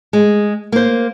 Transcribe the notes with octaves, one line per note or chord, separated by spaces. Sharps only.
G#3
A#3 C5